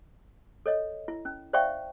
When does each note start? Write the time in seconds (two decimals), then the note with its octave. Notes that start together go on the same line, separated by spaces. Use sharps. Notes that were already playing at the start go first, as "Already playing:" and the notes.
0.66 A4 C#5 D#5
1.08 E4
1.25 C#4
1.53 C5 D5 E5 F5 G5 C#6